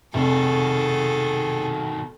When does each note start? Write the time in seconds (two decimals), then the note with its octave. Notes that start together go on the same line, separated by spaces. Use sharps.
0.14 F1 B2 D#3 G#4 A4